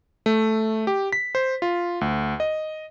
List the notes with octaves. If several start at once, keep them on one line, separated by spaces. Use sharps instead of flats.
A3
G4
B6
C5
F4
D2
D#5